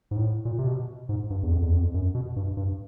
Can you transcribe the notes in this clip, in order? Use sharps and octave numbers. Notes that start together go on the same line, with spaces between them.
G#2
A2
A#2
C3
B2
G#2
G2
E2
F2
E2
F2
F#2
B2
G2
G2